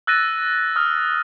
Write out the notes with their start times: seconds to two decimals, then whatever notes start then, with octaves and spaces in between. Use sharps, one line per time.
0.07 E6 F#6 A6 A#6 D#7
0.76 D#6 F6